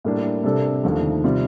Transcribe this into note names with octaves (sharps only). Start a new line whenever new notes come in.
A2 G3 A#3 D4
C3 G3 D4 A4
D#2 D3 F3 A3
C3 G3 C4 F4